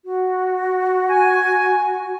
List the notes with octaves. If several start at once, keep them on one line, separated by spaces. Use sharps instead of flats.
F#4
G#5